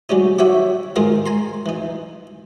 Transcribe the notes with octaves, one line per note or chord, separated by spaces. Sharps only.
F#3 G3 C#4 D#4
D#4 F#4 C#5 E5 G5 D6
G#2 D#3 F4 G#4 A#4 F5
G#5 A#5 C6
E3 D#4